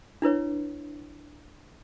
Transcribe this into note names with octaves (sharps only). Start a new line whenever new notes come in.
D4 E4 B4 C#5